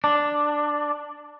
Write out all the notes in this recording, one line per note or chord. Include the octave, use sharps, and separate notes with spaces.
D4